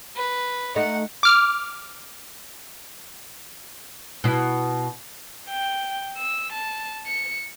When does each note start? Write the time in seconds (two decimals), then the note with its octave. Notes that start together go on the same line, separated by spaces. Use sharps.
0.16 B4
0.76 A3 D#4 F#5
1.23 D6 F6
4.24 B2 E4
5.49 G5
6.17 E6
6.52 A5
7.06 C#7